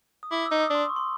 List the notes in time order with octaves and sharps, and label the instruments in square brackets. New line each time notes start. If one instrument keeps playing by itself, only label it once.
[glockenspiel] D#6
[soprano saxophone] E4 [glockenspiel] D6
[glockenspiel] E6
[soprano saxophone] D#4
[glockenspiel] D#6
[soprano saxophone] D4 [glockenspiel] C6
[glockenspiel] C#6
C6